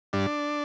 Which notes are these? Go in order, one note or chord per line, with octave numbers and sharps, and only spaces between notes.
G2 D4